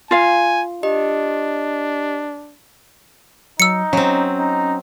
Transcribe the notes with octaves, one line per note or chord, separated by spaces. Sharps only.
F4 F5 G#5
D4 G4 D#5
F#3 D#4 E6 C#7
F#3 C4 C#4
D#4